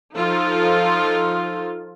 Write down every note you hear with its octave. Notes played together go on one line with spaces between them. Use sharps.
F3 D#4 F4 A4